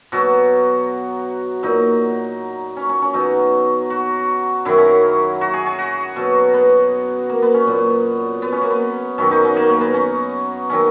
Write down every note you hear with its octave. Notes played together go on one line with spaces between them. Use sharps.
B2 F#3 F#4
A#2 F#3 D#4
C#4
C#4
C#4
B2 F#3 D#4
F#4
F#2 D#3 F#3 E4
C#4
F#4
G#4
G#4
F#4
B2 F#3
B3
A#3
B3
C#4
A#2 F#3 B3
B3
C#4
A#3
B3
F#2 D#3 F#3 C#4
D#4
C#4
A#3
A#3
B3
C#4
D#3 F#3 C#4